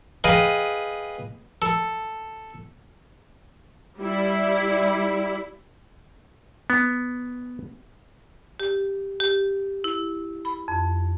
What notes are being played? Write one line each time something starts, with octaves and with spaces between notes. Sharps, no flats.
G#4 B4 D#5 F5 G5
A4
G3 E4
B3
G4
G4
E4
B5
F2